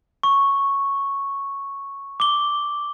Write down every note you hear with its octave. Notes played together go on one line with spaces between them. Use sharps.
C#6
D6 G7